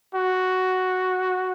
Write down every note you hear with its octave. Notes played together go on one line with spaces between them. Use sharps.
F#4